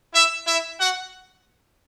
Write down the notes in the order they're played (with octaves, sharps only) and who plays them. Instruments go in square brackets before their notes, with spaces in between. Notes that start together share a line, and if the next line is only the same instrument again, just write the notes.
[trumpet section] E4 E5
E4 E5
F#4 F#5